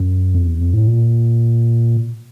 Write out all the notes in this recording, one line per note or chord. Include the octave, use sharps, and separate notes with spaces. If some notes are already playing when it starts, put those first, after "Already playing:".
Already playing: F#2
F2
E2
F2
A2
A#2